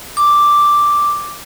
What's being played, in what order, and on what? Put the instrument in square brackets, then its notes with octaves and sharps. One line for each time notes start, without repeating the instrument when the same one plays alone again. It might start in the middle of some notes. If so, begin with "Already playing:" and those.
[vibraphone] D6